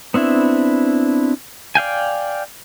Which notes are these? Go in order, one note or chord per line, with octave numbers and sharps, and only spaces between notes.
B3 C4 D4 E4
D5 F5 G5 G#5